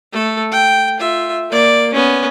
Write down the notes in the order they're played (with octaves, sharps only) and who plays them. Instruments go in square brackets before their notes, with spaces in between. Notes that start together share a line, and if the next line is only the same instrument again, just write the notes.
[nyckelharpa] A3 A4
G5
F4 E5
A#3 D5
B3 C#4